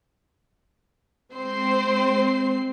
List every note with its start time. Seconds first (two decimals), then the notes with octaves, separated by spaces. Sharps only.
1.35 G#3 C4 C5 C7